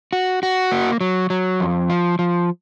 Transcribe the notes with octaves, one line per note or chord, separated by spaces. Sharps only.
F#4
F#4
A#3
F#3
F#3
F2
F3
F3